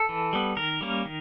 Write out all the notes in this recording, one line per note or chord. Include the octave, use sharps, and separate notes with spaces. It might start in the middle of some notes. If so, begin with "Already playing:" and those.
Already playing: A4
E3
G3 B3
D#3 A#4
G3 A#3 C#4
D#3